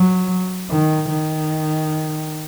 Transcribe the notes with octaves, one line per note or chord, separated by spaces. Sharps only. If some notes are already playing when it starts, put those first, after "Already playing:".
Already playing: F#3
D#3
D#3